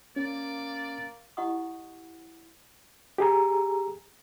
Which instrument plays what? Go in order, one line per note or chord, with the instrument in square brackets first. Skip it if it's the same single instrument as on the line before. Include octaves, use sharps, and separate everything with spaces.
[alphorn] A#3 [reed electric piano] C#4 [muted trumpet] D5
[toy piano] E4 G4 D#5 F#5 C#6 D#6
[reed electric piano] G4 G#4 A#5